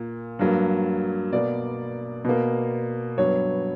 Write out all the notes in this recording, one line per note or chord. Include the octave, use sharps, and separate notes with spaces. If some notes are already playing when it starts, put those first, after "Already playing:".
Already playing: A#2 A#3
G2 F#3 A#3
B2 A#3 D5
B2 A#3
G2 F#3 B3 C#5